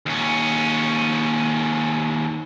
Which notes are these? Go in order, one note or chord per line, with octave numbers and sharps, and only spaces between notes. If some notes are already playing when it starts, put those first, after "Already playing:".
D#2 C#4